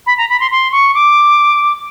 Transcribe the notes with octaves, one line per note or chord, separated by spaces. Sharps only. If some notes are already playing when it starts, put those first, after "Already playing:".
B5
A#5
B5
C6
C6
C#6
D6